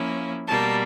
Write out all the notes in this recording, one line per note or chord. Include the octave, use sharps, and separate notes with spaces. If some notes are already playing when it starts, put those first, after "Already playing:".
Already playing: F3 A#3 C#4 E4
B2 G3 A#3 A5